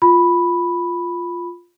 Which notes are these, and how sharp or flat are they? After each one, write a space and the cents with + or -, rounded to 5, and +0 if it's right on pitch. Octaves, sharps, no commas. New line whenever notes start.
F4 +0 B5 +0